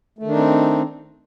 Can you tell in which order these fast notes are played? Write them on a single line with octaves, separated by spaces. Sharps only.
A3 D#3 D4 D#4 C4